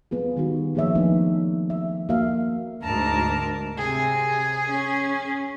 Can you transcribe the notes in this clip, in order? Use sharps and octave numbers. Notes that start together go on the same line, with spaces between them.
B3 F4 G#4
D#3 G3 D#4 F#4
F3 A#3 G#4 C#5 E5
F3 A3 B3 D4 D#4
E5
A#3 F#4 A4 E5 F5
D2 G#2 A#4 A5 A#5
C3 G#4
C#4